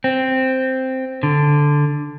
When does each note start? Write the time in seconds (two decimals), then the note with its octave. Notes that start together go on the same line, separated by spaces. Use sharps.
0.04 C4
1.23 D3